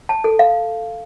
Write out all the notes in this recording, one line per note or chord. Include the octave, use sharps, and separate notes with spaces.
A5
A4
F5